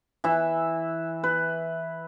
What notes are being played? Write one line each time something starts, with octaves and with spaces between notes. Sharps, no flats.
E3 E5
B4